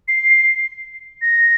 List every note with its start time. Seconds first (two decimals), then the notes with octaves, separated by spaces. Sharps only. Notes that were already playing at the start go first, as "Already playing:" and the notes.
0.08 C7
1.22 A#6